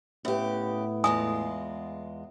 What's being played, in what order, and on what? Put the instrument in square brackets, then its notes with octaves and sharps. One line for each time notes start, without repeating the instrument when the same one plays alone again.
[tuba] A2 [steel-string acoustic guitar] C#3 G4 [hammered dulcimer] B3 E5
[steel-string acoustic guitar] E2 G#3 F4 [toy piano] G#5 D#6